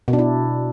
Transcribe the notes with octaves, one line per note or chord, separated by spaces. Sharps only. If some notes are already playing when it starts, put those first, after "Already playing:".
B2
D4
E4